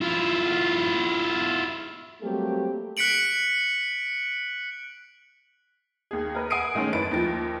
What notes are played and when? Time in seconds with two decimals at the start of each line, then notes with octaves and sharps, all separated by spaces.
0.01 E4 F4
2.22 F#3 G3 A3 A#3 C4 G4
2.97 F#6 B6 C#7 D7 F#7
6.11 D#2 G#4
6.35 A#4 B4
6.50 F#5 G#5 D#6 C7 D7 D#7
6.75 D#3 G#3 A3 C#4
6.93 F#1 E4 B4 A6 D7
7.11 D#2 F3 A6